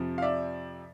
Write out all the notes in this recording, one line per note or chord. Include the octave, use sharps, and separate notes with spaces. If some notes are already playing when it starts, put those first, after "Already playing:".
Already playing: F2 C3 F3
F5
D5 E5